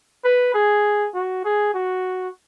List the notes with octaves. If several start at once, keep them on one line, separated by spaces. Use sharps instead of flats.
B4
G#4
F#4
G#4
F#4